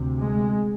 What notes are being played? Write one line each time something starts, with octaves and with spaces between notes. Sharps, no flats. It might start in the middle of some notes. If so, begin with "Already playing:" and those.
Already playing: D2 C3
G#3